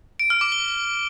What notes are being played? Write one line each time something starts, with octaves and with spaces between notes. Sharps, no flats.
D7
F6
D6
G7